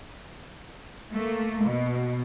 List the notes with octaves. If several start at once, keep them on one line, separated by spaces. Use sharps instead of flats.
A3 A#3
B2